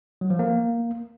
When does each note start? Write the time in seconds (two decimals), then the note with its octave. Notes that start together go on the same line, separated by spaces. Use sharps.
0.21 F#3
0.30 F3
0.39 A#3